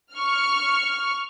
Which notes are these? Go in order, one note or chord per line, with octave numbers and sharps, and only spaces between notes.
C#6 F6